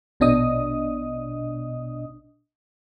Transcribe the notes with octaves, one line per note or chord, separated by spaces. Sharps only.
A#1 B2 D4 D#5 D#6